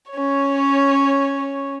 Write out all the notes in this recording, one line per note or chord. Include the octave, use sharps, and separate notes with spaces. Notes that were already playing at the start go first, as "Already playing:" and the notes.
C#4 C#5